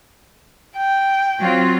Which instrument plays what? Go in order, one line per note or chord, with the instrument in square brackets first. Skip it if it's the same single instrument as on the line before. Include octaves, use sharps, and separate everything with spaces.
[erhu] G5
[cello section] F#3 C4 F4